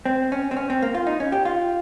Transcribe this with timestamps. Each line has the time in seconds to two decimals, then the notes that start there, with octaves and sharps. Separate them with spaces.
0.06 C4
0.32 C#4
0.51 C4
0.57 C#4
0.70 C4
0.82 A#3
0.94 F4
1.07 D#4
1.20 C#4
1.32 G4
1.45 F4